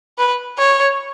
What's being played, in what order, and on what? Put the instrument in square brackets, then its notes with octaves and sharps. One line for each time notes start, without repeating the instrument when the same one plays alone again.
[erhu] B4
C#5